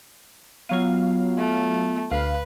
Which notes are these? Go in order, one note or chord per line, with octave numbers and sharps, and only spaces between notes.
F#3 B3 F4 F5
A3
D2 B4 F5